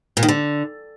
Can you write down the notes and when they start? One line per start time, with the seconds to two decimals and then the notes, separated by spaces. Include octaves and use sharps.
0.17 A#2
0.23 D#3
0.28 D3